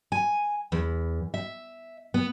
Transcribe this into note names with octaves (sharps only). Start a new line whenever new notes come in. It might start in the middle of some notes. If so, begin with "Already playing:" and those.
G#5
E2
E5
B3